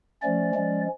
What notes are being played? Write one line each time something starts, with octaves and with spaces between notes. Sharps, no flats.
F3 A3 C#4 D5
F3 G#3 C#4